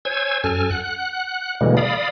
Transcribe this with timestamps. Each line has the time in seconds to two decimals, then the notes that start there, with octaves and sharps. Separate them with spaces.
0.05 C5 C#5 G#5 E6 G#6
0.44 F#2 A4 G#5 F6
0.71 F#5 F#6
1.61 B2 D3 E3 G3 G#3 A#3
1.77 D5 F5 B5 D#6